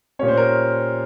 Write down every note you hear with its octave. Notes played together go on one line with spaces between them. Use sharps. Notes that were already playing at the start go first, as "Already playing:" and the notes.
A#2 G3 C#4 C#5
C5
A#4